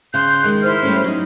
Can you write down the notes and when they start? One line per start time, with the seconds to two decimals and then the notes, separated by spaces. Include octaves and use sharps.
0.14 C#3 C6 F#6 G6
0.43 D#3 G#3
0.63 E4 C5 F6
0.83 G3 A3 C#4
1.04 F#3 D#4